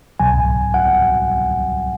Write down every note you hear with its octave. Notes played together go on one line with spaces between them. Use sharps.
C2 B2 F#3 G#5
F#5